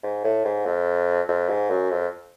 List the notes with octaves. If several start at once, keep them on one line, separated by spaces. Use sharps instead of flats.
G#2
A2
G#2
F2
F2
G#2
F#2
F2